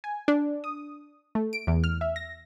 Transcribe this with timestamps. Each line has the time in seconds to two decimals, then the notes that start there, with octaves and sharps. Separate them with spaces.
0.04 G#5
0.28 D4
0.64 D#6
1.35 A3
1.53 D7
1.67 E2
1.84 F6
2.01 E5
2.16 A#6